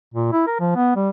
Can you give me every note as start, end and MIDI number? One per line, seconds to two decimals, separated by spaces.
0.14 0.30 46
0.33 0.42 64
0.47 0.57 70
0.60 0.76 53
0.76 0.92 59
0.96 1.10 55